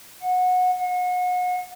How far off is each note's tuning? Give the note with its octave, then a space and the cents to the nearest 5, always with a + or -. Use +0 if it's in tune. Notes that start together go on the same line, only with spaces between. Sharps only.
F#5 -20
F#5 -35